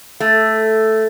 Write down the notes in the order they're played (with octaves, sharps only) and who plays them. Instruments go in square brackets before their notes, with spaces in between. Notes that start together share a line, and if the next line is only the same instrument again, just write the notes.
[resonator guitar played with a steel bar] A3